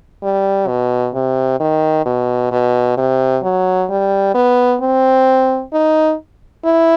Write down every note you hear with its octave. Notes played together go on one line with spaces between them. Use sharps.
G3
B2
C3
D#3
B2
B2
C3
F#3
G3
B3
C4
D#4
E4